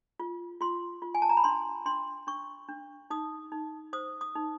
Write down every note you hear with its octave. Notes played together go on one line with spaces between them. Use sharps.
F4
F4 C6
F4
G#5
A5
A#5
B5
D4 C6
D4 C6
D4 C#6
D4
D#4 D#6
D#4
C5 D#6
D#6
D#4